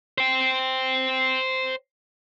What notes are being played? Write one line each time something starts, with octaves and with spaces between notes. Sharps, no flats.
C5 G5